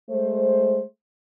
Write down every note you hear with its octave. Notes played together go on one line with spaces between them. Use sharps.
G#3 A3 C5